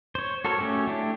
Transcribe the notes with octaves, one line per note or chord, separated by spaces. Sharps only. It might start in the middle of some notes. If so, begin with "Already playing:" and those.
C5 C#5
F#4 A4 A#4 C#5
A3 C#4 F#4 G4
A3 D4 E4 G4